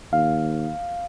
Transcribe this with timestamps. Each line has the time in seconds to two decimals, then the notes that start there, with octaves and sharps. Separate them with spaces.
0.13 D#2 F5